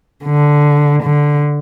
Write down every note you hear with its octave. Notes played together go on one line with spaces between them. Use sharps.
D3
D3